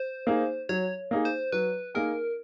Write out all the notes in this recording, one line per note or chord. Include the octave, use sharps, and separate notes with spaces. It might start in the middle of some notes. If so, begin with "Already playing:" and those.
Already playing: C5
A#3 D#4 G#4
F#3 C#5
A#3 D#4 G#4
C5
F#3 B4
A#3 D#4 G#4 A#4